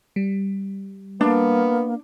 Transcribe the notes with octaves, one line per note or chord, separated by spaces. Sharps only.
G3
A#3 B3 D4